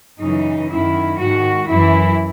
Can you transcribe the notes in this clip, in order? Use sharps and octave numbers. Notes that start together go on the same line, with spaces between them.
F#2 C#3 E3 D#4
F#2 D#3 E4
G#2 D#3 F#4
F#2 E3 E4